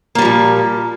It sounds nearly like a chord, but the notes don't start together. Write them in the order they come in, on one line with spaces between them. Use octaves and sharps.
A#3 G3 F3 A#2